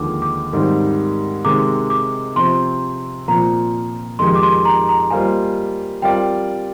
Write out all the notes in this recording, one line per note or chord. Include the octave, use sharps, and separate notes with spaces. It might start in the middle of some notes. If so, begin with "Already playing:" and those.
Already playing: D#2 D3 F3 G#3 D6
D6
G#2 D#3 G3 C4
C3 D#3 G#3 D6
D6
C3 F3 C4 C6
A#2 F3 C4 A#5
F2 D#3 G#3 D#4 G4 C6
D6
C6
A#5
A#5
G3 A#3 F4 C5 D#5 G#5
G3 C4 F4 A#4 D5 G5